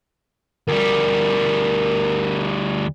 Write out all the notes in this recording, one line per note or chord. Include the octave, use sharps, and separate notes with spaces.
D2 G3 A#4